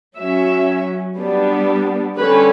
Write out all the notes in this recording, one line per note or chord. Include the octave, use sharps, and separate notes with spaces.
F#3 C#4 E5
G3 B3 D4
D3 G3 C#4 B4